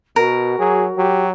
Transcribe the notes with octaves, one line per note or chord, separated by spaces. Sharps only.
B2 F#4 A#4
F#3 G#4
F#3 G4